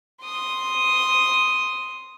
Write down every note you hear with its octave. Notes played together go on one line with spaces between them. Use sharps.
C6 D#6